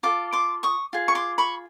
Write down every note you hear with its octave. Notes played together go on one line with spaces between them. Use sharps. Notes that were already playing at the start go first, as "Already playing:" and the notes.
F4 A4 D6
C6 D6
C#6 D#6
F4 G#4
C#6
C6 D6
B5 C#6